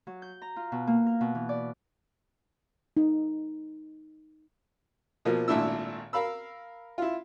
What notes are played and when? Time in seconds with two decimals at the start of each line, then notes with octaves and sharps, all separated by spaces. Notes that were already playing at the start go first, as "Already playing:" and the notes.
0.07 F#3
0.22 G6
0.42 A#5
0.56 F4
0.72 B2
0.87 A#3
1.06 A#4
1.21 B2
1.35 E3
1.49 D5
2.97 D#4
5.25 B2 F3 A#3
5.48 G#1 A#2 A3 D4 E4 E6
6.13 A#4 F5 B5 E6
6.98 E4 F4